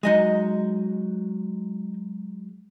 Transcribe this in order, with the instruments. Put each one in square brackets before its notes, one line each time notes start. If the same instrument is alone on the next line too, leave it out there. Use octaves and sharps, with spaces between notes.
[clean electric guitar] F#3 G#3 [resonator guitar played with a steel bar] D#4 D#5 G#5